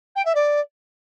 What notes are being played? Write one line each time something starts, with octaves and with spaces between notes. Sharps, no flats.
G5
E5
D5